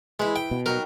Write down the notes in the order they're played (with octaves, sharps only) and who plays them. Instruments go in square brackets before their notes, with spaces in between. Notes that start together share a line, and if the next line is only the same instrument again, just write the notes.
[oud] E3 E4 [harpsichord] G#3
[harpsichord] G5
[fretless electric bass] B2
[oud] F#3 G3 D#4 [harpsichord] A#4